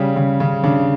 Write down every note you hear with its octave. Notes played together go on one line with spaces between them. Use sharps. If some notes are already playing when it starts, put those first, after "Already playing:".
Already playing: C#3 G3 C#4
C#3
C#3
C#3 D4